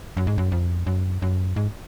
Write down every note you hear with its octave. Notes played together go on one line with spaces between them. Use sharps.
F#2
G#2
F#2
F2
F#2
F#2
G#2